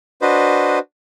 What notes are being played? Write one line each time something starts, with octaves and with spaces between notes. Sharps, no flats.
D4 F#4 B4 C5 D#5